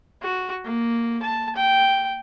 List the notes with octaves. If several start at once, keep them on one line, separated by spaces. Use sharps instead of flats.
F#4
A#3
A5
G5